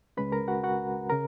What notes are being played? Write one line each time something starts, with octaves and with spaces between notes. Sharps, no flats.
C#2 C#3 G#3 C#4 B4 B5
A#4 A#5
F#4 F#5
F#4 F#5
C#3 A#4 A#5